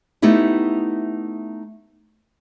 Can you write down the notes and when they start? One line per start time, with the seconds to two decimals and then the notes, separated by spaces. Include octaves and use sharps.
0.22 A3 B3 D#4 E4 G4